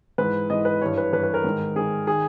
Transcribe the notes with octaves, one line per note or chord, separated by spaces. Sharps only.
G#2 E3 B4
G#2 E3 D#5
B4
G2 E3 C#5
B4
G2 E3 B4
B4
A#4
G#2 D#3
G#2 D#3 G#4
D#3 G#4